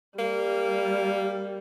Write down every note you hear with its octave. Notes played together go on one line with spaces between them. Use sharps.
G3 A#3